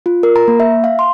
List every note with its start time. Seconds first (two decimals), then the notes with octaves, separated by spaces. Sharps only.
0.06 F4
0.23 A#4
0.36 A#5
0.48 A#3
0.60 E5
0.84 F5
0.99 C6